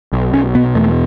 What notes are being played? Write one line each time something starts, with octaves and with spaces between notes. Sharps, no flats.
B1
B1 C#4
B2 B3
E2 A3